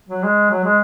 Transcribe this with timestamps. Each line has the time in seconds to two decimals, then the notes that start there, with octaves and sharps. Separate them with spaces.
0.09 F#3
0.23 G#3
0.50 F#3
0.64 G#3